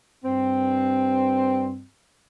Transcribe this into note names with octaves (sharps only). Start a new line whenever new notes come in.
G2 C4